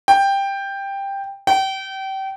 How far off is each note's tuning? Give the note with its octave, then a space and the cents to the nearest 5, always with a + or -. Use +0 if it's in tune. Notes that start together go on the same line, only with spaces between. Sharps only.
G5 +10
G5 -30